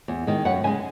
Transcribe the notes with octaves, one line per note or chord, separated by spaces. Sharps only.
E2
D#3 G#3
F#2 F#5
C#3 G#3 G#5